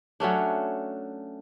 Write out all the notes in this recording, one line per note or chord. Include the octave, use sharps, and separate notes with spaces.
F#3 A3 C#4 D4